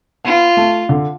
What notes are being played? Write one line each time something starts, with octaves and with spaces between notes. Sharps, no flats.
B3 F4
A3
D3